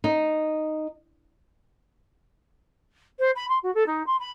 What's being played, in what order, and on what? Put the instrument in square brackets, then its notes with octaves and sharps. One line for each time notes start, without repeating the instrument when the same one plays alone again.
[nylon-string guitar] D#4
[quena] C5
B5
C6
F#4
A4
D#4
C6
B5